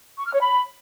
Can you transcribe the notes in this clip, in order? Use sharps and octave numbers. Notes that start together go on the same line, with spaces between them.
C#6
F6
C#5
B5